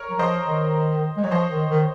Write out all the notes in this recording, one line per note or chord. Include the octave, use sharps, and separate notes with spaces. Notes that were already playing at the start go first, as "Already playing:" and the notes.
Already playing: A#4 C#5
F#3
F3 C5 D#5
D#3
G#3
F#3 C#5
F3 C5 D#5
D#3
D#3